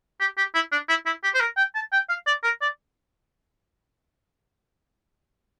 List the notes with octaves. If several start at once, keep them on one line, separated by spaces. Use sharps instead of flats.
G4
G4
E4
D4
E4
E4
G4
C5
A#4
G5
A5
G5
F5
D5
A#4
D5